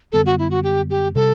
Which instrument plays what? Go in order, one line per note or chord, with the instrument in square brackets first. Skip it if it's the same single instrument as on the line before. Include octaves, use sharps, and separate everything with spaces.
[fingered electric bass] F#2 D3 G3 B3 [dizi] A4
[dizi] F#4
E4
F#4
G4
G4
[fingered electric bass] C3 G3 [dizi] A4